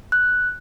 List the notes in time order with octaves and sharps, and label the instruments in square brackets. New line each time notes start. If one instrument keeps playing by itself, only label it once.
[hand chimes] F#6